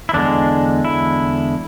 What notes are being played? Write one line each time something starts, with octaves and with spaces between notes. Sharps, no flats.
E4
E2 D3 G#3 D4
E4